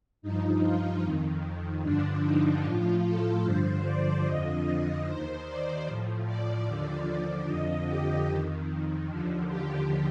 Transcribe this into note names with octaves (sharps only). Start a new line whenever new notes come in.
G2 F3 D#4
F4
F2 D#3
G2 D3 F3 D4
D#4
A2 F3 F4
A4
G2 D3 F3 C5
D5
F2 D3 F3 D#5
D#2 D#3 C5
D5
A2 F3
D5
D#2 D3 F3 D5
F2 D3 F3 D#5
G4
F2 D#3
D#2 D3 F3
G4